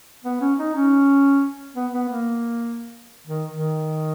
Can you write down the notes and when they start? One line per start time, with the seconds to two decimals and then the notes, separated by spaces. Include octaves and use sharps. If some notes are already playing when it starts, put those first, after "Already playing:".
0.24 B3
0.41 C#4
0.58 D#4
0.75 C#4
1.75 B3
1.93 B3
2.09 A#3
3.27 D#3
3.52 D#3